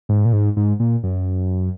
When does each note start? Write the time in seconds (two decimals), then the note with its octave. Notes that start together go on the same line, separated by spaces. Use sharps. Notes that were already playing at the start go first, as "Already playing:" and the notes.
0.09 G#2
0.25 A#2
0.33 G#2
0.57 G#2
0.80 A#2
1.03 F#2